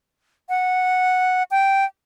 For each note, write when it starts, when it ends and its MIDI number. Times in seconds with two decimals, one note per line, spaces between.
0.49 1.43 78
1.51 1.85 79